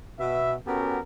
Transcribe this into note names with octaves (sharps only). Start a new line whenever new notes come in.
B2 E5
B3 C#4 F#4 G4 A4 A#4